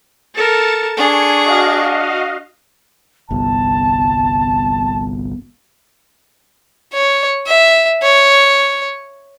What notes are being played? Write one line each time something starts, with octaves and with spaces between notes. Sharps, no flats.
A4 A#4 A6 C#7 E7
D4 G#4 G#5 C#6
F#4 D#5 F5
G1 C2 B3 A5
C#5
E5
C#5